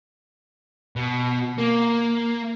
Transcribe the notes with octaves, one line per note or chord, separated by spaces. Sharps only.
B2
A#3